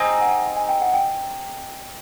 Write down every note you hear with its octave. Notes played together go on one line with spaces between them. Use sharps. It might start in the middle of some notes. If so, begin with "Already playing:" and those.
Already playing: C4 D#4 G#4
F#5
G#5
G5
F#5
G5